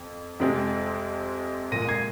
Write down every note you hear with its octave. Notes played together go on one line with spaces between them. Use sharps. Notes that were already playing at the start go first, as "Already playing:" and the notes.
Already playing: F2
F2 C3 G#3 C4
A#2 F3 G#3 A#6 D#7
D#7
G#6 C7